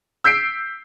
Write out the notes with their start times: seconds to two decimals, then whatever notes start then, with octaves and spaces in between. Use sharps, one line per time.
0.24 E6 G6 B6 C7 D7